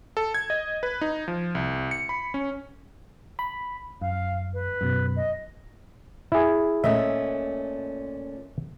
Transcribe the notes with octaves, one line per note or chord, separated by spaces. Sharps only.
A4
G#6
D#5
B4
D#4
F3
C2
C#7
B5
C#4
B5
F#2 F5
B4
F#2 B2
D#5
E4 G#4
A#2 A3 C#4 D#5 E5